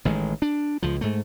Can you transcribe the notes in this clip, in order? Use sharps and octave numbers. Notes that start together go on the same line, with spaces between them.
A1 D#3 G#3
D4
C#2 F3
G#2 A3